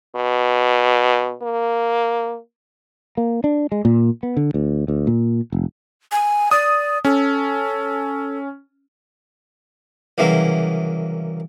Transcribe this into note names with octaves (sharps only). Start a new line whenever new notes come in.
B2
A#3
A#3
D4
G#3
A#2
B3
D3
D2
D2
A#2
F1
G#5
D5 D#6
C#4 A4
C2 C#3 E3 F#3 A#3